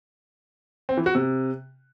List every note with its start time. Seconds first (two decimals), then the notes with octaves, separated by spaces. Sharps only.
0.89 C4
0.97 E3
1.06 F#4
1.15 C3